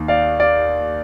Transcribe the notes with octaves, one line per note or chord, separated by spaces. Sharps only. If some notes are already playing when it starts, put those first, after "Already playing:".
Already playing: D#2 D#3
D5 F5
D5 F5